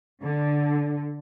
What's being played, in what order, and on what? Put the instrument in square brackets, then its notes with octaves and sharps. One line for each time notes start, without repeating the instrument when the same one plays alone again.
[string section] D3